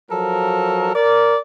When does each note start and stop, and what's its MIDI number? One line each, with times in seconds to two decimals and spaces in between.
0.11 0.92 53
0.11 0.92 54
0.11 0.92 69
0.11 0.92 70
0.95 1.39 70
0.95 1.39 74